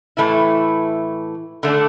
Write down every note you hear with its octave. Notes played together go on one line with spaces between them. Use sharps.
A2 E3 A3 E4
D3 A3 D4